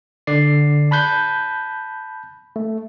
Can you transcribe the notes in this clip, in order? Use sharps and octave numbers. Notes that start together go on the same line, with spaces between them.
D3 D5 C7
A5 B5 F#6 G6
A3